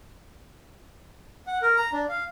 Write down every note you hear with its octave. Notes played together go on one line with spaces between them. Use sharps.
F#5
A#4
A#5
D4
F5